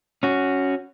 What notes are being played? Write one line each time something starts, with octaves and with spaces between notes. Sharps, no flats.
C#4 F#4